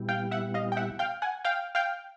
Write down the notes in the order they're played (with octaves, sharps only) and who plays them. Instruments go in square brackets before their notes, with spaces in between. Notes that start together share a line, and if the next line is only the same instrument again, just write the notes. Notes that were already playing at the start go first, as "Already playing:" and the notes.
Already playing: [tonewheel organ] A#2 G3 B3 E4 G4
[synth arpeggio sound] F5 G5
E5 F#5
D#5 F5
G5
E5 F#5
F5 G5
F#5 G#5
F5 G5
F5 G5